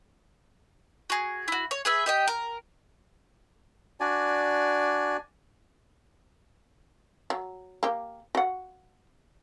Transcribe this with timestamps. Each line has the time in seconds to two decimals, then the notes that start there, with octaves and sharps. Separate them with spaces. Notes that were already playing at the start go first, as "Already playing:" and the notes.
1.10 F#4 G#4
1.48 E4 F#4
1.71 C#5
1.85 G#4 B4 E5
2.06 G4 D#5 G5
2.28 A#4
4.00 D4 F#4 D5 G#5
7.30 F#3
7.83 A#3 G4
8.35 F#4 F#5